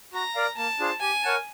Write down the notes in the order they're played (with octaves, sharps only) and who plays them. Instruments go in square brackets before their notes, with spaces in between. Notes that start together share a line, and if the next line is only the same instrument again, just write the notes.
[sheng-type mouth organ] F#4 [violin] A#5
[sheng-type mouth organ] A#4 D5 F5
[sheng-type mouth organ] A#3 [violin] A5
[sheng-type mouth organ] D4 F4 G#4 C5
[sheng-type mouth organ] G4 [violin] G#5
[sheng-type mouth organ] A#4 C#5 F#5 A5